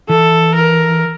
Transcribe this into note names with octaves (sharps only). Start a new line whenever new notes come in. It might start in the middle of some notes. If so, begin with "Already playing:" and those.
E3 A4
A#4